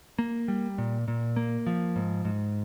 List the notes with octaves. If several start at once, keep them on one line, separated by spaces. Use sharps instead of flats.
A#3
G3
A#2
A#2
A#3
F3
G#2
G#2